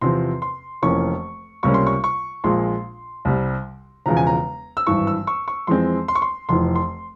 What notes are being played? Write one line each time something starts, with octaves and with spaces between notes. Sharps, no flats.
E2 C3 F3 C4 C6
C6
F1 F2 E3 A#3 C#4 C#6
C#2 C3 G3 A#3 C#4 C#6
C6
C#6
C#6
A#1 A#2 G#3 C6
C2 C3 G3
E1 E2 C#3 F3 A#5
G#5
A#5
E6
G#1 G2 E3 C#6
E6
C#6
C#6
F2 E3 G#3 C4 C6
C6
C#6
C6
F1 F2 E3 C6
C6